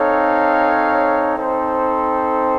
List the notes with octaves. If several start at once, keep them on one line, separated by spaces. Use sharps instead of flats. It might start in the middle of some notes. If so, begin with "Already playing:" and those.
Already playing: C4 D#4 A4 C#5 F5
C4 D#4 A4 C5